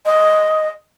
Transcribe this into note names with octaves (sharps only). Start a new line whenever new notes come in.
D#5